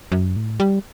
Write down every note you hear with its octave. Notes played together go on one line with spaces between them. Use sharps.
F#2
A2
G3